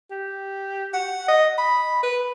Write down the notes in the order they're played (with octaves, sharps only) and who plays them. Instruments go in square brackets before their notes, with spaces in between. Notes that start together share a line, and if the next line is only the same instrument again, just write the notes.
[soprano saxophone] G4
F#5
D#5
B5
B4